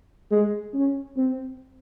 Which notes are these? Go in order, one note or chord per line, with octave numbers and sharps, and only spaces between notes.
G#3
C#4
C4